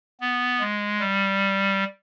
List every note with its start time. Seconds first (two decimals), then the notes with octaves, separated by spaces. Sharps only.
0.21 B3
0.60 G#3
1.00 G3